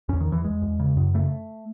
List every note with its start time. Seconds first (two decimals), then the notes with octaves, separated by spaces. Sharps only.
0.09 E2 C#4
0.20 D#3
0.27 E2
0.32 E3
0.44 E2 G#3
0.62 E2
0.80 C#3
0.97 F#2
1.14 C#3 A3